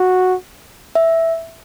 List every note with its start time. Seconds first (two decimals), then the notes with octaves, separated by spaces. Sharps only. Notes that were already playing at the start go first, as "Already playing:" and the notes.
Already playing: F#4
0.95 E5